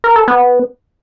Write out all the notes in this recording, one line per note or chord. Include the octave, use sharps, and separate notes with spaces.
A#4
A4
B3